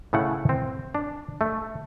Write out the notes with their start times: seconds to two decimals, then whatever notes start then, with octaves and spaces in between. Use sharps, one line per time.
0.13 A2 C#3 A3 E4 F#5
0.49 C4
0.95 D4
1.41 A3